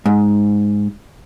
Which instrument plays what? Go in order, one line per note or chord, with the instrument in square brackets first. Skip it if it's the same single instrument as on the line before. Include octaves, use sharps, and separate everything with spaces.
[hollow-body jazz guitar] G#2